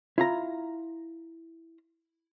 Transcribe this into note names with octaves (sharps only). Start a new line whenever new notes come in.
E4 F4 A#5